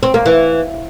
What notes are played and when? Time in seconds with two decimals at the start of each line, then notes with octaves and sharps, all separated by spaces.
0.03 C4
0.14 A#3
0.26 E3